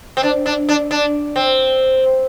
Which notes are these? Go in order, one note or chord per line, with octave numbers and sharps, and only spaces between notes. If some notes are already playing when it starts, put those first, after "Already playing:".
C4
D4
D4
D4
D4
C4